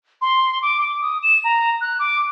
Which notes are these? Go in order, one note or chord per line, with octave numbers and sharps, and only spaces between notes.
C6
D6
D6
D#6
E7
A#5
F#6
D6